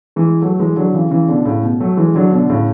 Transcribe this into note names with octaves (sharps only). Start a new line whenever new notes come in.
E3 G#3
F#3 A3
E3 G#3
D3 F#3
C#3 E3
C#3 E3
B2 D3
A2 C#3
B2
F#3 A3
E3 G#3
D3 F#3
B2 D3
A2 C#3